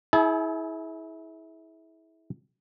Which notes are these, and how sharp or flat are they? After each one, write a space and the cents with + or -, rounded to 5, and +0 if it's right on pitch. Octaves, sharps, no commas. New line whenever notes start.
E4 -25 G#4 +30 A5 -45